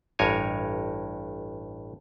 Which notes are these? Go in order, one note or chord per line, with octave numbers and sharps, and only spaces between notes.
A1 G2 A#4 C#5 G#5